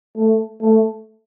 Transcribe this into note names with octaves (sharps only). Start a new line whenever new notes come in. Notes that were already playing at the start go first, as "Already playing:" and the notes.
A3
A3